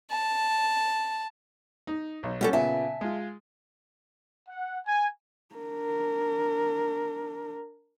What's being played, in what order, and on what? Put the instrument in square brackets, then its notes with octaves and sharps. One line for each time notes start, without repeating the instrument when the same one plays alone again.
[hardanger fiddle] A5
[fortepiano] D#4
B1 C#5
[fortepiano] G3 [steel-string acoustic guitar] B3 C#4 A4
[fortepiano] A#2 C#3 B3 [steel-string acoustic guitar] E5 G#5 A5
[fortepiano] G#3 F4
[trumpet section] F#5
G#5
[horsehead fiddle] D4 A#4